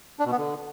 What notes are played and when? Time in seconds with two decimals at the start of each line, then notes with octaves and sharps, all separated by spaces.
0.19 D4
0.26 B2
0.32 B3
0.38 D3